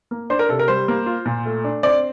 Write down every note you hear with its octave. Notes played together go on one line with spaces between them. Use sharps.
A#3
D4 C5
A#4
C3 A4
A#4
G3 C5
A#3
F4
A#2
A3
D4
C4 D5